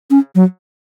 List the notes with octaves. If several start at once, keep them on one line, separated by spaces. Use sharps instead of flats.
C#4
F#3